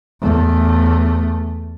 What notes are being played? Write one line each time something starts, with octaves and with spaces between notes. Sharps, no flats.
E2 A3